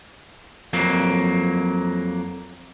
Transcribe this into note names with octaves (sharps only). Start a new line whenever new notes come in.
F2 F#3 A#3